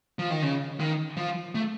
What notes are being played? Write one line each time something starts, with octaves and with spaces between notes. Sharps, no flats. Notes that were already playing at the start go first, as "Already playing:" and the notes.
F3
D#3
C#3
D#3
F3
A3